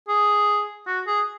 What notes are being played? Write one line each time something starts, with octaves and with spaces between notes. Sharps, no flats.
G#4
F#4
G#4